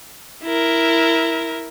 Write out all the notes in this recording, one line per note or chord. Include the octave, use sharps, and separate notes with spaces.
E4 A#4